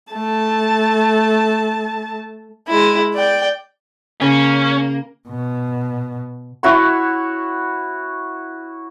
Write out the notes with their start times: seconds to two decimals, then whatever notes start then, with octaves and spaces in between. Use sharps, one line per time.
0.13 A3 A5
2.68 G#3 E4
3.14 D5 G5
4.21 C#3 A#3 C#4
5.28 B2
6.63 E4 F#4 C#5 C#6